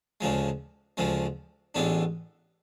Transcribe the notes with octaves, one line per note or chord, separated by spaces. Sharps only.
D2 C#3 F3 G#3
D2 C#3 F3 G#3
A1 A2 G#3 B3 D4